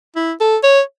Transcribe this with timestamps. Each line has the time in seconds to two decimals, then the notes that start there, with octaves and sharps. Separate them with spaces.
0.16 E4
0.40 A4
0.63 C#5